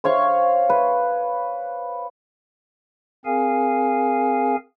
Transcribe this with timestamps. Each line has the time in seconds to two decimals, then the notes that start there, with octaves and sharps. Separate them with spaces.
0.04 C5 C#5 F5 C#6
0.70 B4
3.26 C4 G#4 A#4 F5 G#5